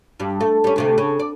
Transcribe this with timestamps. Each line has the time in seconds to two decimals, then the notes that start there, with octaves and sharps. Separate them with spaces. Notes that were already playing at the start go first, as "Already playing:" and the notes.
0.20 G2 G3
0.41 A3
0.64 G3 C#4
0.76 D2 C3 A3
0.98 C#3
1.19 D5